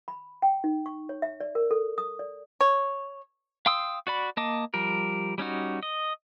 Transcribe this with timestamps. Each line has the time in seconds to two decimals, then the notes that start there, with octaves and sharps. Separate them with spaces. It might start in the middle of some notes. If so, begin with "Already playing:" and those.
0.08 B5
0.42 G5
0.64 D#4
0.86 C#6
1.09 C#5
1.22 E5
1.40 D5
1.55 A#4
1.71 A4
1.98 D#6
2.19 D5
2.61 C#5
3.66 F5 G5 C6 D#6 E6
4.07 F#4 D5 B5
4.37 A#3 D#5 A5 D6
4.74 F3 G3 A#4
5.38 G3 C#4 D#4 F#4
5.83 D#5